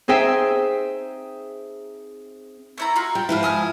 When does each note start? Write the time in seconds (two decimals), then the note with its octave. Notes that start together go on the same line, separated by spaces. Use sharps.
0.08 C4 D#4 G#4 C5 E5 G5
2.78 A3 E4 A#5
2.96 F4 F#4
3.15 G3 G5
3.29 G#2 F3 E4 B4 F6
3.43 G#5 D#6 F6